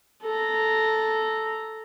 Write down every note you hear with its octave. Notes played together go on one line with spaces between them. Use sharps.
A4 A#5